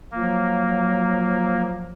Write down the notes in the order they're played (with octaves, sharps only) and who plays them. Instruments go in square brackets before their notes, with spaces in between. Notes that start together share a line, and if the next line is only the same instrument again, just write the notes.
[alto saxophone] F3 [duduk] F#3 [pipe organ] A#3